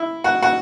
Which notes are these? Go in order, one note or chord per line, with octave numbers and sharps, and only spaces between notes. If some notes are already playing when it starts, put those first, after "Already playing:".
Already playing: E4
F#4
F#4